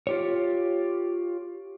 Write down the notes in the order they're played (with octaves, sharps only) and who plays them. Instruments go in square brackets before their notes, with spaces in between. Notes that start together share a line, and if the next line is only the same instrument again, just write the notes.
[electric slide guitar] F4 G4 C#5